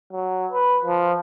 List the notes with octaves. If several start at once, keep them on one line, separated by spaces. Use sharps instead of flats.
F#3
B4
F3